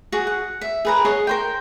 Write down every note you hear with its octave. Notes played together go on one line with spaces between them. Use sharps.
F#4 G#4
F#5
E5
G#4 B4 A#5
G#4 C#5 D#5 F#5
A#4 C5 G5